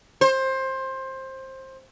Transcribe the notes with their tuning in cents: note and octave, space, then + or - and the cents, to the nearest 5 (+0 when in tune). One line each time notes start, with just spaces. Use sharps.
C5 +20